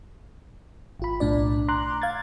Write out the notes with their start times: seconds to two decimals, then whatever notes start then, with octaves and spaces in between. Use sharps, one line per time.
1.00 G#1 F4 B5
1.20 B1 A2 D4 D5
1.68 A#5 C6 D6 F#6
2.02 F5 G#6 A6